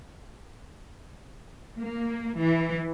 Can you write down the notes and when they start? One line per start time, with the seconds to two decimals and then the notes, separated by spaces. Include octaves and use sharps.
1.77 A#3
2.38 E3